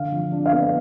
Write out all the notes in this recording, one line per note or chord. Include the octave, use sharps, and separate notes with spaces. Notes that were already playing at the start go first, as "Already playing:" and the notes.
Already playing: D3 F5
F3
D4
F5
B3